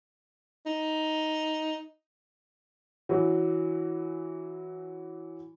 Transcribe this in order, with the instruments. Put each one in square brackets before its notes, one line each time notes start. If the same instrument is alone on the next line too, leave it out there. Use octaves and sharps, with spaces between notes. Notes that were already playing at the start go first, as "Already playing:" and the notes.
[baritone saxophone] D#4
[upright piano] E3 F#3